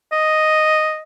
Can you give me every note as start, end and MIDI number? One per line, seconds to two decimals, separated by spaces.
0.12 1.01 75